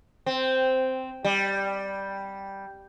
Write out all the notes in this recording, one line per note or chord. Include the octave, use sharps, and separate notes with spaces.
C4
G3